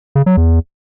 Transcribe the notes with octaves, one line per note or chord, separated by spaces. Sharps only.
C#3
F#3
E2